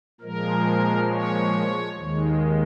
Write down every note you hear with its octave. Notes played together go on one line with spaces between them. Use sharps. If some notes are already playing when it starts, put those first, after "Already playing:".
A#2 F3 G#3 A#4
C#5
D#2 D#3 G#3